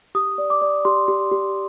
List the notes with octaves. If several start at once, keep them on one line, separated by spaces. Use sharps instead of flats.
G4 D#6
D5
D6
D5
G4 C6
G4
G4